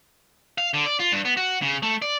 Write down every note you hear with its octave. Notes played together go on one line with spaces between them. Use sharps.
F5
D3
D5
F4
G2
B3
F#4
C#3
A3
D5